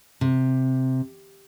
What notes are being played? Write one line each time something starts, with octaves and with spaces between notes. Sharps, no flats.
C3